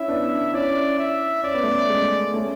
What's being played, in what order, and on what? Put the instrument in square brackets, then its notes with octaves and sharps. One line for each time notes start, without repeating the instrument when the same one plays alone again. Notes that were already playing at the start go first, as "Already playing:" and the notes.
Already playing: [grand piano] C#4 E4 [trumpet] E5
[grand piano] B3 D4
[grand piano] C#4 E4 [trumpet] D5
[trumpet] E5
[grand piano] C#4 [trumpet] D5
[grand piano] B3
A3 C#4
G#3
A3 C#4